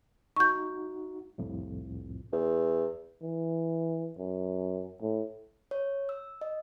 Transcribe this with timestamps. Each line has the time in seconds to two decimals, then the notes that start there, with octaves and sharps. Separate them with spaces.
0.36 D#4 F#4 C#6 G6
1.38 C2 F2 A2
2.33 E2
3.22 E3
4.18 F#2
5.02 A2
5.71 C#5
6.09 E6
6.41 D#5